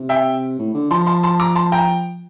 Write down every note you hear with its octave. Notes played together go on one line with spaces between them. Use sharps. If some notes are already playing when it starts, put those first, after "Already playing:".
Already playing: C3
E5 G5
A2
D3
F3 A5 C6
A5 C6
A5 C6
A#5 D6
A5 C6
G5 A#5